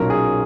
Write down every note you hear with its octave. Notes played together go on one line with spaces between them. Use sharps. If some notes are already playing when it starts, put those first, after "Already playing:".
Already playing: B1 A#2 F#3 C#4 A#4
G#4